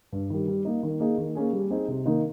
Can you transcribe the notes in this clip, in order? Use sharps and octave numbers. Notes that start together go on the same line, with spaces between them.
G2
D#3 G3
G3
A#3 D#4
D#3
A#3 D#4 G#4
D#3
A#3 C#4 G#4
G3
C4 D#4 G#4
C3
D#3 A#3 D#4